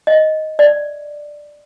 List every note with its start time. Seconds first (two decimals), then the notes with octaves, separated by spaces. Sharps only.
0.07 D#5
0.59 D5